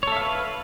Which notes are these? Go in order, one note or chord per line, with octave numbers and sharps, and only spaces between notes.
A4 B4 C#5 E5 F5